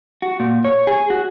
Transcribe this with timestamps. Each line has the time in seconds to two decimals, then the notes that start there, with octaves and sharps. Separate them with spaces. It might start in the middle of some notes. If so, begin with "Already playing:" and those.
0.22 F#4
0.40 A#2
0.65 C#5
0.87 G#4
1.10 F#4